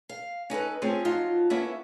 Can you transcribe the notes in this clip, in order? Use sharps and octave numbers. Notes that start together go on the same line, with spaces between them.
F5
C#4 D#4 A4 B4
A3 C4 C#4 F4 G#4
F3 F#3 D#4 F4 A5
A#3 B3 C#4 E4 A4 E5